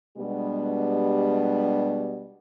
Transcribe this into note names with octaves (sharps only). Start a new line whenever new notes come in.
B2 G3 G#3 B3 D4 G4